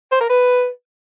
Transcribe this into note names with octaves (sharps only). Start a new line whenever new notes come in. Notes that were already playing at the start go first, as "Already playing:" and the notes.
C5
A#4
B4